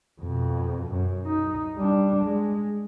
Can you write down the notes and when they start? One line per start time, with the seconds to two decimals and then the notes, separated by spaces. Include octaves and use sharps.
0.21 F2 B2
0.92 F#2
1.27 D#4
1.76 G3 D4
2.25 G#3